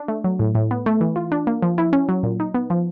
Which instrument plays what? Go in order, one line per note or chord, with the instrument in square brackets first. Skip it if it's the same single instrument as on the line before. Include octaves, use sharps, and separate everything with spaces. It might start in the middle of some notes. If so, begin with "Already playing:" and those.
Already playing: [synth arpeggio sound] D4
A3
F#3
A2
A2
B3
A3
E3
F4
D4
A#3
F3
E4
C#4
F#3
A#2
D#4
B3
F3